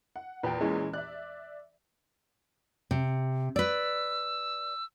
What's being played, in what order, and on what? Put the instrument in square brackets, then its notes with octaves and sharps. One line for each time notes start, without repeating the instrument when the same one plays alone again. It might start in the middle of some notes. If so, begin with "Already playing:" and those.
[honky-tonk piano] F#5
[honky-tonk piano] E2 A#2 [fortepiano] B4 G5
[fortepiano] E3 G#3 C#4
[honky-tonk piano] D5 E5 [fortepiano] F#6
[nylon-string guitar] C3
[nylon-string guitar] B4 D5 [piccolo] E6